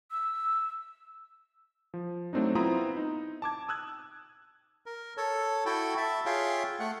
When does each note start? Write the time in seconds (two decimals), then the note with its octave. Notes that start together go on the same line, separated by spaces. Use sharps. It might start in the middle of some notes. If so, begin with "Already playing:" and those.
0.11 E6
1.94 F3
2.33 F#3 A3 C4 D4 D#4
2.55 B3 C4 E4 F4 A#5 D#6
2.97 D#4
3.42 A5 D6 G#6
3.68 D#6 E6 F#6 G#6
4.86 A#4
5.17 A4 C#5
5.66 E4 F#4 A4 G5
5.97 E5 A5
6.26 F4 G#4 C#5 E5 F5 G5
6.79 A3 F#5